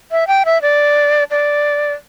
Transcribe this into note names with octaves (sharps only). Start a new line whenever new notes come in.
E5
G5
E5
D5
D5